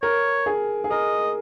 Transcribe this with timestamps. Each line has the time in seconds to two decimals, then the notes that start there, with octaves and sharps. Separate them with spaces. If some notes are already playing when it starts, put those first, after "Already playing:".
0.02 A#4 C#5
0.46 G#4
0.84 G#4
0.90 A#4 D#5